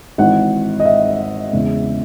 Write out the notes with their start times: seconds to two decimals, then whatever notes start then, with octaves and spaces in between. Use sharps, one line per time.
0.18 G#1 G#2 E3 F#5
0.80 D#5
0.85 E5
1.53 E2 C#3 G#3